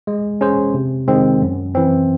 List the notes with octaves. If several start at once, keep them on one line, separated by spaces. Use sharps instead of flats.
G#3
C#4 G#4 C5
C3
D#3 G#3 C4
F#2
E3 C4